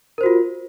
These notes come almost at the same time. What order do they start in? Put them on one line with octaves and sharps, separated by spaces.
A#4 C5 F#4 F4